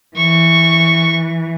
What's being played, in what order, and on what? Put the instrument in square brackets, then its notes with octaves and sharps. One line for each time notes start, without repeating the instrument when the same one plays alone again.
[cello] E3 [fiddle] C#6